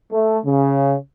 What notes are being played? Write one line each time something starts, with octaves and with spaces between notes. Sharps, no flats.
A3
C#3